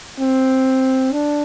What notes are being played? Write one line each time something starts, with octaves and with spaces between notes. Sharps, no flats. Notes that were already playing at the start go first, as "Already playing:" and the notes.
C4
D4